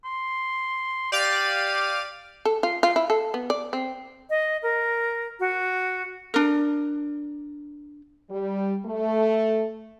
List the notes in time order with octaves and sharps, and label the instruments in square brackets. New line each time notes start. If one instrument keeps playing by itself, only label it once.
[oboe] C6
[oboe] G4 [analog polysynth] D5 F5 D#7
[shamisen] A4
F4
F4
E4
A4
B3
D5
C4
[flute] D#5
A#4
F#4
[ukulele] D4 A#4
[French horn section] G3
A3